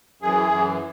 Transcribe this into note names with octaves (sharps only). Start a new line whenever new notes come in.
F#2 E3 G#4
F#2 E3